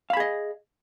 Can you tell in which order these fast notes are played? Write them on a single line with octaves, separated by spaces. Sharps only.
F5 B5 G#4 D#5